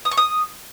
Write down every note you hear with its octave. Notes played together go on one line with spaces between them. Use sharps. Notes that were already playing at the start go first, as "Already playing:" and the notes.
D#6
C#6
D#6